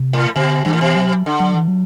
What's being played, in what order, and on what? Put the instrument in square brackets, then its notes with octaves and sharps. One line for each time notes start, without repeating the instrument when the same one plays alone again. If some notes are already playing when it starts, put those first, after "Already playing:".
Already playing: [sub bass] C3
[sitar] A2
[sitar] B2 [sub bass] D3
[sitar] G2 [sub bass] E3
[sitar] A2
B2
[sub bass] F#3
[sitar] D3
[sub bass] F#3
E3
F#3